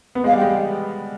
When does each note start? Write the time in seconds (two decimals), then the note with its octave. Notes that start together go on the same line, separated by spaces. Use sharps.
0.15 B3
0.24 G#3 F5
0.33 G3
0.37 G#3 G5